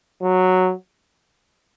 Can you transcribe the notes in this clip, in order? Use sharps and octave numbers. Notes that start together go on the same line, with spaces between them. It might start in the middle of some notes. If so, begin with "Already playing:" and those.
F#3